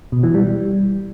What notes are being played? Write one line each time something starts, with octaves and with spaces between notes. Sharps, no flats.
B2
E3
G3